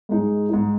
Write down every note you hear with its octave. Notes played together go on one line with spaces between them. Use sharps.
G#2 G#3 D#4
G#2 G#3 D#4